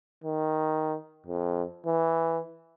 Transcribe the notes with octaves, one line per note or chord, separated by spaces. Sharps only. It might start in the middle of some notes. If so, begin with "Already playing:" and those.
D#3
F2
E3